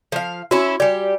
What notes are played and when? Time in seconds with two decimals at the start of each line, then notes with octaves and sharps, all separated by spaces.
0.12 F3 F5
0.51 C#4 E4 F#4
0.80 G3 G4 D5 G#5